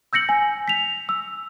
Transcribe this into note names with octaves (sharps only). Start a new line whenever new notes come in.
E6 G6 A#6 C#7 F#7
G#5
B6 F7
E6